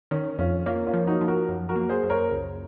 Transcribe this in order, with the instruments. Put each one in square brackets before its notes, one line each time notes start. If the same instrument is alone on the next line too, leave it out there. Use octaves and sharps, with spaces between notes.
[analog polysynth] D#3 [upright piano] C#4
[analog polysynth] F2 [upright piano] C#4 F4
[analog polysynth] A#3 [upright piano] C#4 F4
[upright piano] C#4 F4
[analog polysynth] F3
[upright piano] D#4 F#4
[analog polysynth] F3
[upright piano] F#4 A#4
[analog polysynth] F#2
[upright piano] F#4 A#4
[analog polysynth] A#3
[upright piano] G#4 C5
[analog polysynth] F#2
[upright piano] A#4 C#5
[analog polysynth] C#2